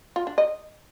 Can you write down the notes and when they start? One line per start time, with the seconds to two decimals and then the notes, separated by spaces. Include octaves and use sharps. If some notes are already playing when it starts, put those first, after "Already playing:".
0.16 F4
0.27 D4
0.38 D#5